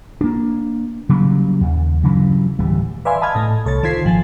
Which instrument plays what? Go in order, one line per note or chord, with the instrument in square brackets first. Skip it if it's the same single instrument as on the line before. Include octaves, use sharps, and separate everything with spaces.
[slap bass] A#3 D4
C#3 F#3 G3 A#3
D#2
G2 C#3 E3 F#3
D1 E3 G3
[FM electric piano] B4 D5 E5 F5 G#5 C6
D#5 A5 B5 D#6 F6 G#6
A2 A3
C2 A4 C#5 A6
D#3 F4 C5 G#6 B6 C7
G#1 A#2 F3 G#5 A6